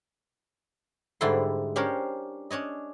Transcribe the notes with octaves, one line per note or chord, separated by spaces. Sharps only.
G#2 D3 G3 G#3 E4 C6
C#4 D4 G4 A#4 C5 C#5
C#4 D4 C#5 D#5